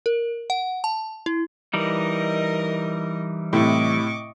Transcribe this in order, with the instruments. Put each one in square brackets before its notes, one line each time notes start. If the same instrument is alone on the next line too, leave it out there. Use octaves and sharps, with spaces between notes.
[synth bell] A#4
F#5
A5
E4
[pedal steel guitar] E3 G3 D#4 [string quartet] A#4 D#5
[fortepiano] A2 C3 E4 [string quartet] D#5 C#6 D6